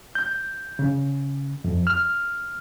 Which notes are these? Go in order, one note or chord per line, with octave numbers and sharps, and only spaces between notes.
G6
C#3
F2
F6